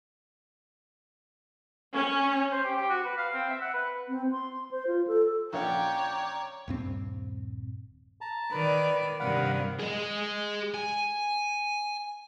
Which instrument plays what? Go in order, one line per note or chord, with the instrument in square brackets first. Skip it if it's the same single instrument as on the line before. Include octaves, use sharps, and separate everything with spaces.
[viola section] C#4
[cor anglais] C5
G4
G4
F#4
B4
F5
C4
E5
F#5
B4
[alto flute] C4
C6
C5
F4
A4
[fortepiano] A#1 C#4 F#5 [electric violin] C#5 D5 [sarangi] G5 [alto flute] A#5
[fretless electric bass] D#1 G2 C4
[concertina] A5 A#5
[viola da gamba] D#3 D5 [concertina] B4 B5
[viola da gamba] G2 C3 D#3 [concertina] F5 F#5 B5
[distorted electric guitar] G#4 D#5
G#5